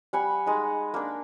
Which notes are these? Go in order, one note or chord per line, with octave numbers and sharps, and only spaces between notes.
G3 F#5 G#5 B5
G#3 D#4
A#3 D4